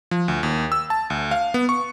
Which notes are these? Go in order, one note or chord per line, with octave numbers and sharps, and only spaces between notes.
F3
D2
D#2
E6
A5
D2
F5
B3
C#6